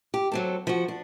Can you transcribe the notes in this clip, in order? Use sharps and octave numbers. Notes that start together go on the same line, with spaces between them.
G4
F#3 C4 A4
F3 F#4
D4